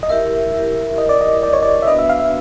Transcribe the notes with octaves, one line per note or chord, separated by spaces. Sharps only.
D#5
E4 G4 A#4 E5
E4 G4 A#4
E4 G4 A#4 D#5
D5
D#5
E4 G4 A#4 D5
C#5
D5
E5
B3 D4 F#4 B4 D#5
E5
F5
E5